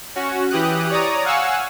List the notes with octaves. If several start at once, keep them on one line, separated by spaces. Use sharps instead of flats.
C#4 F#4
E3 G4 D#6 F#6
C#5 D5 A#5 D#6
F5 F#5 G#5 C#6 E6